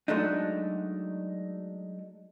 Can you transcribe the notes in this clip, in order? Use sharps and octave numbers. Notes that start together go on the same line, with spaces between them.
F#3 G#3 A3 D4 D#4